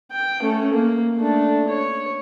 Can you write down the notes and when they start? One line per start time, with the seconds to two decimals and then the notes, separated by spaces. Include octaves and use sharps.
0.11 G5
0.41 A3 C#4
0.73 A#3
1.16 A3 D4
1.68 C#5